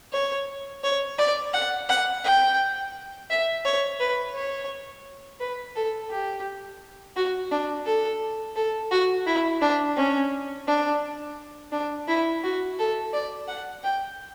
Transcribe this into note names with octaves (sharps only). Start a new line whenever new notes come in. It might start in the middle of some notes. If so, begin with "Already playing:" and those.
C#5
C#5
D5
F#5
F#5
G5
E5
C#5
B4
C#5
B4
A4
G4
F#4
D4
A4
A4
F#4
E4
D4
C#4
D4
D4
E4
F#4
A4
D5
F#5
G5